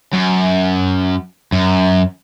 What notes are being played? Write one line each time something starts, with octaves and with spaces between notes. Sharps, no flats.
F#2
F#2